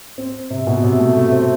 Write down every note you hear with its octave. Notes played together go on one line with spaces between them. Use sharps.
C4
C3
B2
C3
A3
A3
C4